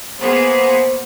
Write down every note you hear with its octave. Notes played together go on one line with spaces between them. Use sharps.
A#3 B3 G#4 C5